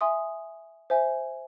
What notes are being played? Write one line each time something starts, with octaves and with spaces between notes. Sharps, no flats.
E5 G#5 C6 D#6
C5 E5 G#5